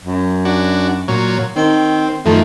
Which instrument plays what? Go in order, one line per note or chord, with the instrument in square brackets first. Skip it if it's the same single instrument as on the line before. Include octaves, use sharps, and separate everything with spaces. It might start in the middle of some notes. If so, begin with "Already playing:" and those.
[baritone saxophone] F#2
[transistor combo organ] D4 F#4
A#2 F#3 C#5
[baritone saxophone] D#3 [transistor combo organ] C4
[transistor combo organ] F#2 D#3 F3 [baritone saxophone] A3